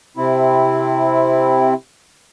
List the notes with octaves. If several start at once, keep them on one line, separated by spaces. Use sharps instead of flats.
C3 C4 E4